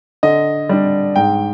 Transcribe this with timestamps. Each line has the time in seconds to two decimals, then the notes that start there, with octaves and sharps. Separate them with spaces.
0.23 D3 D#5
0.69 G3 D4
1.16 G#2 G5